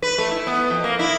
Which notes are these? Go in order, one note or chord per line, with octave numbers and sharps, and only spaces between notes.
B4
A3
E4
B3
F2
A#3
E4